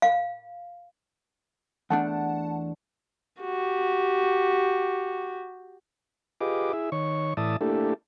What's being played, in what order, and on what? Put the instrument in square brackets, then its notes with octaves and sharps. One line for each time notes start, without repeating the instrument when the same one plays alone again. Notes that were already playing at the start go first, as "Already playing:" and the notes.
[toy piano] F5
[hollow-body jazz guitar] E2 A3 D4 [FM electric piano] F#5 A5
[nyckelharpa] F#4 G4
[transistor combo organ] F4 G4 G#4 B4 D#5 D6
E4 G#4 E5
D#3 C#5 C#6
A2 E3 D5 E5 A5 D#6
A3 A#3 D4 E4 G4 A4